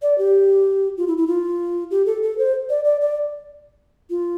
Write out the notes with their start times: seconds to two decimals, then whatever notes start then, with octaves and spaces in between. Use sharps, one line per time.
0.02 D5
0.18 G4
0.97 F4
1.08 E4
1.18 E4
1.27 F4
1.91 G4
2.06 A4
2.23 A4
2.38 C5
2.70 D5
2.85 D5
3.01 D5
4.10 F4